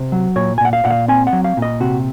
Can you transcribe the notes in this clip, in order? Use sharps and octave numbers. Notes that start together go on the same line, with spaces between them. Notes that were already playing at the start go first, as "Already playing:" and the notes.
Already playing: C3 C5
F#3
A#2 C#5
G#5
A#2 F#5
F5
A#2 F#5
F5
C4 G#5
F#5
F#3
F5
A#2
D#5
C3 F#4